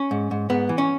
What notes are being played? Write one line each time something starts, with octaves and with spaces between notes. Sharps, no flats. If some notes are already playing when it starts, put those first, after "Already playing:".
Already playing: C#4
G#2
G#2
G#2 B3
E3
C#4